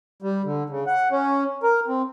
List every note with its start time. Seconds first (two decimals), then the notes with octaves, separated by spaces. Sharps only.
0.22 G3
0.45 D3
0.69 C#3
0.87 F#5
1.11 C#4
1.63 A#4
1.87 C4